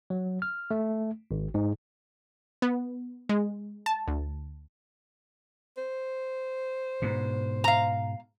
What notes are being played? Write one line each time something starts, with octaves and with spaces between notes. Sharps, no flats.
F#3
F6
A3
G#1
G#2
B3
G#3
A5
D2
C5
G#2 B2
F5 A#5